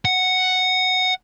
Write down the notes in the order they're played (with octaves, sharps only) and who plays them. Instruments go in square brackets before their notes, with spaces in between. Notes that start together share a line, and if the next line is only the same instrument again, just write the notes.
[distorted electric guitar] F#5